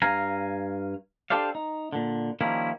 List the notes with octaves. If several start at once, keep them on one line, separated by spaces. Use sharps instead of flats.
G2 F5 G#5 A#5
D4 G4 A4 C5 D5 F5
D#4
A#2 D3
D#3 F3 G3 A#3 C#4 E4